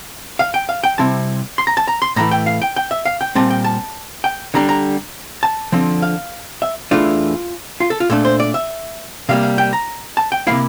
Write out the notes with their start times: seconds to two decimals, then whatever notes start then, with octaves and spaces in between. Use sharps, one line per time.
0.39 F5
0.54 G5
0.69 F5
0.84 G5
0.98 C3 G3 C4 E4 A5
1.58 C6
1.67 A#5
1.77 A5
1.87 A#5
2.02 C6
2.16 A2 E3 A3 E4 A#5
2.31 G5
2.46 F5
2.62 G5
2.76 G5
2.91 E5
3.05 F5
3.21 G5
3.35 A#2 G3 C4 A5
3.50 G5
3.65 A5
4.24 G5
4.54 D3 G3 D4 A#5
4.69 A#5
5.43 A5
5.72 D3 F3 C4
6.02 F5
6.62 E5
6.91 E2 C3 E3 A3 D4 F4
7.80 F4
7.90 A4
8.00 F4
8.10 A#2 A3 D4 A4
8.25 C5
8.40 D5
8.54 E5
9.29 C3 G3 A#3 F5
9.43 F5
9.58 G5
9.73 A#5
10.17 A5
10.32 G5
10.47 C3 F3 A#3 E4 F5